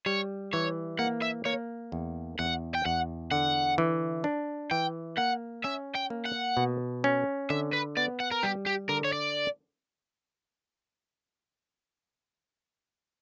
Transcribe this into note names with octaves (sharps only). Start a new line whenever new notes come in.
G3 C#5
E3 C#5
A#3 F#5
E5
A#3 C#5
E2
E2 F#5
G5
E2 F#5
D3 F#5
E3
D4
E3 G5
A#3 F#5
C#4 E5
G5
A#3
F#5
B2
C#4
D3 E5
B4
B3 D5
F#5
A#4
G3 G4
G4
D3 A#4
C#5
D5